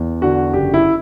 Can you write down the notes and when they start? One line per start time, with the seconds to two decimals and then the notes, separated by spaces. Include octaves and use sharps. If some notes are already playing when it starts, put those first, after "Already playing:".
Already playing: E2
0.22 D3 F#4
0.53 F#1 G4
0.74 E4